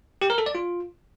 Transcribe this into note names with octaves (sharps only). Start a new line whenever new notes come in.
G4
A#4
A4
D5
F4